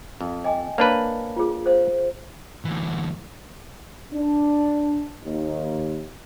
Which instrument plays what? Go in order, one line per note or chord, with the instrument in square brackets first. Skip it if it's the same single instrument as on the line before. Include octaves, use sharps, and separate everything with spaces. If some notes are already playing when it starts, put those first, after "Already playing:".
[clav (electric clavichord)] F2
[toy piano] D#5 G5 G#5
[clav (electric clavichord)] A#3 D4 B4 [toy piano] C#5
[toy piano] F4 G#4
C5 F5
[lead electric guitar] D2 E3
[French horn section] D4
D#2